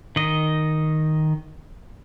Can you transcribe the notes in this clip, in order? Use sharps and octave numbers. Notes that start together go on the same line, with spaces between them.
D#3 D#5